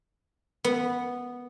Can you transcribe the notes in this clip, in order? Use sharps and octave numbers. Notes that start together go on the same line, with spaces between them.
B3